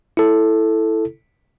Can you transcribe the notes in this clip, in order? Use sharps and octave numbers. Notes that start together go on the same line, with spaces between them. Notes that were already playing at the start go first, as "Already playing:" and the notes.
E4 A4